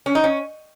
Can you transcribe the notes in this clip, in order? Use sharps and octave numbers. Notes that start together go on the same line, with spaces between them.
C#4
D#4
C#4